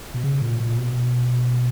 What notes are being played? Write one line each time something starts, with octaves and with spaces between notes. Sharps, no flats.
B2
C#3
A#2
A#2
B2